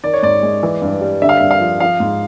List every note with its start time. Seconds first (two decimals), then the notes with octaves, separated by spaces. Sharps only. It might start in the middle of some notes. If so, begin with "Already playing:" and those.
0.04 D#3 D5
0.13 C#5
0.23 G#2 D5
0.43 G#3
0.63 E3
0.82 G2
1.01 G3
1.22 D3 E5
1.29 F5
1.37 G2 E5
1.51 F5
1.60 F3
1.80 F3 F5
2.00 G#2